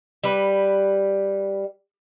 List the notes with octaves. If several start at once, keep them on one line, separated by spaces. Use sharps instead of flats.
G3 B4